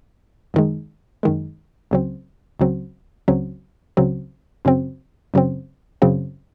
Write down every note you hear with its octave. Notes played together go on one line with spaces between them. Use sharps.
F#2 D#3 G#3
F#2 D#3 G#3
C#2 C#3 F#3 C4
C#2 C#3 F#3 C4
C#2 C#3 F#3 C4
C#2 C#3 F#3 C4
F#2 C#3 F#3 C4
F#2 C#3 F#3 C4
F#2 C#3 F#3 C4